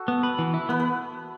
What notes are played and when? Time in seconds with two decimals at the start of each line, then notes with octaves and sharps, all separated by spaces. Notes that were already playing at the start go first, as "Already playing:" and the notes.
Already playing: F#4 A4
0.08 B3
0.23 B4
0.39 E3
0.54 E4
0.69 B3 B4
0.80 B4